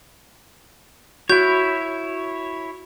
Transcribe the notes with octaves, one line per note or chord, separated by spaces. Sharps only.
E4 F#4 C#5 G6